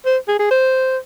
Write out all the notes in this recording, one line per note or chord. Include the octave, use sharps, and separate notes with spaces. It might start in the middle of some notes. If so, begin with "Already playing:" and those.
C5
G#4
G#4
C5